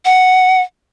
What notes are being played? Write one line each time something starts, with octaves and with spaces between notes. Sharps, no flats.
F#5